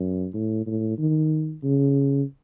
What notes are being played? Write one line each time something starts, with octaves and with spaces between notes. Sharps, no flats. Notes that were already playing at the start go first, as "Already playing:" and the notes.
Already playing: F#2
A2
A2
D#3
C#3